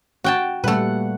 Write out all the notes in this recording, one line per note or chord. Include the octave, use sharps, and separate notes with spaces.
F#4 G5 A5
A#2 G3 A3 B4 F#5